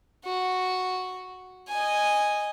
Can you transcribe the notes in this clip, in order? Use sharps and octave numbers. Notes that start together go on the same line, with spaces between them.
F#4
D#5 G#5